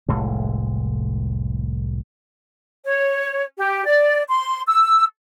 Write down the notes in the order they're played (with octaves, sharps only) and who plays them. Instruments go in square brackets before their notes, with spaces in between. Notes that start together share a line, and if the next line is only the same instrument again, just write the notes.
[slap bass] F1 C2 A2 G#3
[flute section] C#5
G4
D5
C6
E6